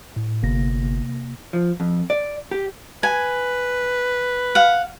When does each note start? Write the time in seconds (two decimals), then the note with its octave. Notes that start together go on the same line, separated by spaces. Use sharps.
0.16 A2
0.43 G1 C3 A#3 A#6
1.53 F3
1.80 F2
2.10 D5
2.51 G4
3.03 B4 G#5
4.55 F5 F#5